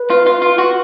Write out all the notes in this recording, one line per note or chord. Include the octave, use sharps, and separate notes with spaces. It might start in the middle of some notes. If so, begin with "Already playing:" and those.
Already playing: B4
F4
F4
F4
F#4